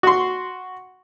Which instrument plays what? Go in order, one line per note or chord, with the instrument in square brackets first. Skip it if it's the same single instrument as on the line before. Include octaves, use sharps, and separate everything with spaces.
[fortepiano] F#4 C6